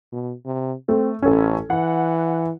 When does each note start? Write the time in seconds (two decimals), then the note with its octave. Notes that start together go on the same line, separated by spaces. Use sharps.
0.12 B2
0.45 C3
0.88 A3 C4
1.22 A1 C#4 A4
1.70 E3 F#5